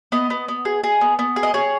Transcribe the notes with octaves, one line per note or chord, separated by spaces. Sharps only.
B3 D#5
B3
B3
G#4
G#4
B3
B3
G#4
D#5
G#4 C#5